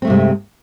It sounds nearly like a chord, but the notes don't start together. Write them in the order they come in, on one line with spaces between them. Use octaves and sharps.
C4 A3 G2 C3 G#3